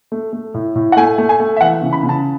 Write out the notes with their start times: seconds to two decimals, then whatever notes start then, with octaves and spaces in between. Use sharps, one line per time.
0.12 A3
0.33 A3
0.54 A2
0.75 A2
0.92 F#5
0.97 A3 G#5
1.18 A3
1.29 G#5
1.40 A3
1.57 E5
1.61 E3 F#5
1.82 C#3
1.93 B5
2.03 C#3
2.09 A5